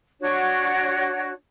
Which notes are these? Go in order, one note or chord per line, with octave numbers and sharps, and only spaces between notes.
D4 F#4 C#5